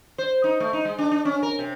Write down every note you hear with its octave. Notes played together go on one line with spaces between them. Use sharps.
C5
D#4
A3
D#4
G#3
D4
D4
C#4
A#4
C3